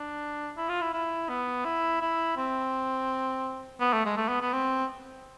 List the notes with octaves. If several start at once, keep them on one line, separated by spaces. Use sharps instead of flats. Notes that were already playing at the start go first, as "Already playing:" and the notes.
Already playing: D4
E4
F4
E4
E4
B3
E4
E4
C4
B3
A3
G#3
A3
B3
B3
C4